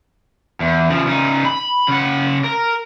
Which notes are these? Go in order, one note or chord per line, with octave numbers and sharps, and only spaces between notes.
E2
C#3 F3
C#3 D#4
B5
C#3 F#5
A#4